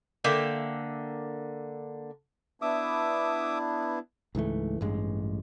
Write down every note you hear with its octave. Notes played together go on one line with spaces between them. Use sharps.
D3 A#3 E5 G5
B3 D4 E4 E5 D6 D#6
C#2 G#2 E3 A3
A1 G2 G#3